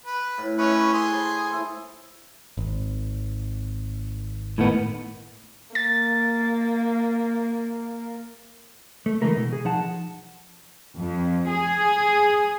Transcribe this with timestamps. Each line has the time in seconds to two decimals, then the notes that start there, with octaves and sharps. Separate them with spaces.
0.06 B4
0.38 A2
0.58 C#4 B4 D#5 E5 C#6
0.94 G#4 C6
1.12 C5 A5 B5
1.51 A3 E4
2.57 G#1
4.58 A2 D#3 B3
5.75 A#3 A6
9.06 A3
9.22 D3 E3 G#3 A3 A#4
9.36 B2
9.53 G#4
9.65 F3 D#4 F#5 A5
10.98 F2
11.49 G#4